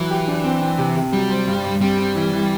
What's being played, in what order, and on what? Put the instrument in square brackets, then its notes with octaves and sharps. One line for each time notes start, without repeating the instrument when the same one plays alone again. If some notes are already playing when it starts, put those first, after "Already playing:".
Already playing: [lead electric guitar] E3 [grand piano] F#3
[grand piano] G4
D4
C4
C4
C3
C3
[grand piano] F#3 [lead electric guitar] G3
[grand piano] C5
G2
G2
[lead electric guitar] G3 [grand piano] C4
[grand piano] C4
E3
E3